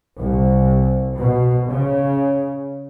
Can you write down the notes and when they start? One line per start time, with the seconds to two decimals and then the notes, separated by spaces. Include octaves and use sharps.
0.20 C2
1.18 B2
1.70 C#3